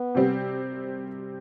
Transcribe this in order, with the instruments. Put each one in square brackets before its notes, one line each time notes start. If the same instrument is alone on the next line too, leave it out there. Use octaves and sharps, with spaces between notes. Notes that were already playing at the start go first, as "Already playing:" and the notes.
Already playing: [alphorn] B3
[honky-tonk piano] C3 G3 C4 G4